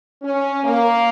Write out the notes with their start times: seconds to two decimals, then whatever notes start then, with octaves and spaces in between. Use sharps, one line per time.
0.22 C#4
0.64 A#3